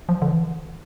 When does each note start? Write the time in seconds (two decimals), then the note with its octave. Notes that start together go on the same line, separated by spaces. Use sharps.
0.09 F3
0.22 D3
0.27 E3